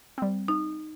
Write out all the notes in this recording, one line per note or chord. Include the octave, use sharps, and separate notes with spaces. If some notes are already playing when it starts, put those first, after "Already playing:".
G3 C4
D#4